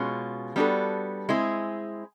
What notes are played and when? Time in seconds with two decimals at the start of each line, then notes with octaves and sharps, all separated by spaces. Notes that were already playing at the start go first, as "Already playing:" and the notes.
Already playing: B2 G#3 C#4 F4
0.56 G3 B3 D4 F#4 A4
1.29 G#3 C4 E4 G#4